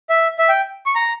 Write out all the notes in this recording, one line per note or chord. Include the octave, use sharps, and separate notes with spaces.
E5
E5
G5
C#6
A#5